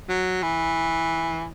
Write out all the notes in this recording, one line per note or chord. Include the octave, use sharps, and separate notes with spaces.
F#3
E3